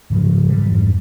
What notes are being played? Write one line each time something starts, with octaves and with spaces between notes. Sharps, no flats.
G#2 C#3 F3 F#3
G#2 E3 G3
F2 G#2 G3